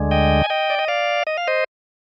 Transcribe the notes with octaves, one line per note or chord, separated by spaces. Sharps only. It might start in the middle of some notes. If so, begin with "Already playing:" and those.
Already playing: D2 D3 G#3
D#5 G5
G#5
D#5 G5
D5
D#5
D5 F5
D#5
F5
C5 D#5